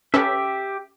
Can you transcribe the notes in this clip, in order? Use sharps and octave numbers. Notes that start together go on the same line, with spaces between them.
C#4 G4 A4 B4 E5